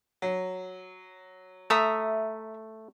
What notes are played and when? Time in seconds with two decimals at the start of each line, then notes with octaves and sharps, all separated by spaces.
0.22 F#3
1.70 A3 E5 A#5 D#6